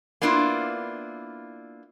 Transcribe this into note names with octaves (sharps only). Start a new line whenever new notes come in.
A#3 B3 D4 E4 F4